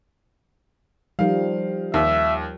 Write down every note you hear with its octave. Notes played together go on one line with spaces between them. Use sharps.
D#3 F3 G3 F5
D#2 E5